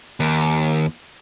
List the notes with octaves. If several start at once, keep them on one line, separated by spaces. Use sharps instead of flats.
D#2